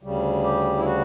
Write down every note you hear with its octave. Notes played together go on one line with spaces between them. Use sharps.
D2 C#3 G3
G4
E4
F#4